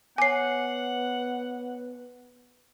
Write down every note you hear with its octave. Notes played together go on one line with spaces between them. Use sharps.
B3 C#5 F#5 G#5 D6 C7